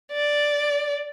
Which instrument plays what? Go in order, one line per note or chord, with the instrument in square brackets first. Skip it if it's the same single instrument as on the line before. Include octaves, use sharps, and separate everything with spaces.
[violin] D5